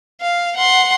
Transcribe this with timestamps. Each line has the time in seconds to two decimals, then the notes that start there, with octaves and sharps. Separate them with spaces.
0.22 F5
0.57 F#5 C6